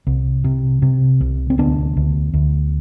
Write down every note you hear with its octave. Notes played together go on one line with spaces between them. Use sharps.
C2
C3
C3
C2
C4
D2 B3 D4
D2
D2